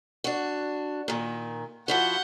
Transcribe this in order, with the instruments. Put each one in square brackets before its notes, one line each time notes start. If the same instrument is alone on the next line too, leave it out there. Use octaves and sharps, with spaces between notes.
[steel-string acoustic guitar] D4 F#4
A#2 D#3
[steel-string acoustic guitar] F3 E4 F#4 [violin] F#5 G6